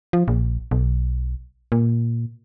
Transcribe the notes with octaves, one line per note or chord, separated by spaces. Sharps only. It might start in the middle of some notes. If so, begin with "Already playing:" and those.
F3
A#1
B1
A#2